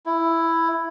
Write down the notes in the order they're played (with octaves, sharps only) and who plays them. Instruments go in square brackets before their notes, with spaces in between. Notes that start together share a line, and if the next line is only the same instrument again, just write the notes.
[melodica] E4